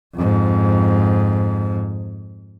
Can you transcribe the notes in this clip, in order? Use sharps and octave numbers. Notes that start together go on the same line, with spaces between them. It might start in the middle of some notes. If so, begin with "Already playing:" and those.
F2 G#2